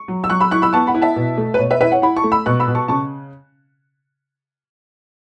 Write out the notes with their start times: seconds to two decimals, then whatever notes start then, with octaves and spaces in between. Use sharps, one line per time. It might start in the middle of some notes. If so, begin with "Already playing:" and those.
Already playing: C#6
0.08 F#3
0.24 E6
0.30 F#3 C#6 F#6
0.40 B5 E6
0.51 E4 C#6 F#6
0.62 B5 E6
0.73 B3 A5 C#6
0.87 F#5 B5
0.95 E4
1.02 E5 A5
1.16 B2
1.38 A3
1.54 B4
1.59 B2 C#5
1.71 B4 E5
1.81 E4 B4 E5
1.92 C#5 F#5
2.02 E4 F#5 B5
2.17 A5 C#6
2.24 A3
2.32 B5 E6
2.46 B2 C#6 F#6
2.60 B5 E6
2.68 B2
2.75 A5 C#6
2.88 C#3 A5 C#6